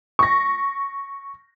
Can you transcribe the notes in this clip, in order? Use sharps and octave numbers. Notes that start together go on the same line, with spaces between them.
C#6 A#6